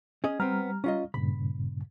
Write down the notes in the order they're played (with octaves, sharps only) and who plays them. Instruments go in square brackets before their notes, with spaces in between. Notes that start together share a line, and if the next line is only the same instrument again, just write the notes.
[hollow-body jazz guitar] C#4 G#4 D#5
[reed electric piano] G3 A#5 F6 [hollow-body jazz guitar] B3 C4
[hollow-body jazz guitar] C#4 F4 D#5
[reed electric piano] G2 A#2 C#3 [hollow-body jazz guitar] B5